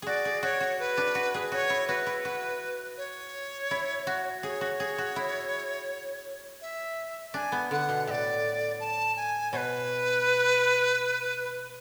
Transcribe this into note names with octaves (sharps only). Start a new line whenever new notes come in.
F#4 G#4 D5
G#4
F#4 C#5
F#4
B4
D4
F#4
G#4
F#4 C#5
E4
F#4 B4
E4
F#4
C#5
E4
F#4
G#4 C#5
F#4
G#4
F#4
E4
E5
D4 G#5
B3
D3 F#5
B2
A2 D5 E5
A5
G#5
B2 B4 C#5